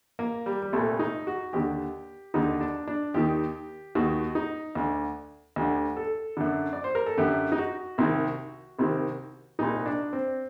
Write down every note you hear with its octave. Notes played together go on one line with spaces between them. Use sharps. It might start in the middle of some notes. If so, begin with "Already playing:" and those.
A#3
G3
G3
C2 A#2 A3
D#4
F#4
D#2 D3 G4
D#2 D3 D#4
D4
D4
D#2 D#3 G4
D#2 D#3 F#4
D#4
D2 D3
D2 D3 G4
A4
F#2 D3
D5
C5
A#4
A4
F#2 D3 G4
D#4
F#4
C2 C3 D#3
C2 C3 D#3
C2 A#2 D#4
D4
C4